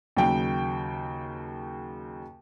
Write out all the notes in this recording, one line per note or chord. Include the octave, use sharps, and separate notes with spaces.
D#2 C#3 F#3 G5